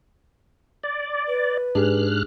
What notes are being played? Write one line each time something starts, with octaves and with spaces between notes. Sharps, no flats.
D5
B4
G#2 D4 G4 G#4 F6 F#6